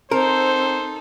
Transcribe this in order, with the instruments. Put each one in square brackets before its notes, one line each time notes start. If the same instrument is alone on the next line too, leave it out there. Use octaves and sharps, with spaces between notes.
[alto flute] C4 [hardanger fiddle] D#4 A4 [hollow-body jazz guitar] A#4 [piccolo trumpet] C5